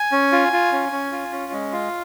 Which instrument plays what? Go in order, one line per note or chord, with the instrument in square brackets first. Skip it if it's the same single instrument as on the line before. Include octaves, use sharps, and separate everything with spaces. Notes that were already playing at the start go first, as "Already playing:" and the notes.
Already playing: [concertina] G#5
C#4
F4
F4
C#4
C#4
F4
C#4
G#3
F4